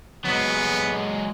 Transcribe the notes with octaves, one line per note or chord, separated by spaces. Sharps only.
F#3 G#3 B3